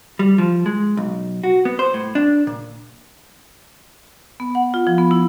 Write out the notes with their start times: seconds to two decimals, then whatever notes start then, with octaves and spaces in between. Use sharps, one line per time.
0.19 G3
0.38 F3
0.66 G#3
0.97 B1
1.44 F#4
1.65 B3
1.79 C5
1.94 A2
2.15 D4
2.47 A#2
4.40 B3
4.55 F#5
4.74 F4
4.87 F3
4.98 B3
5.11 E4